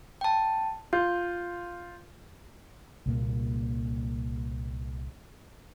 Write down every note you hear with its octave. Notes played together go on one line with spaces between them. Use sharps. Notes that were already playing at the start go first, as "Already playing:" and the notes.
G5 A5
F4 G6
C2 A#2 A#3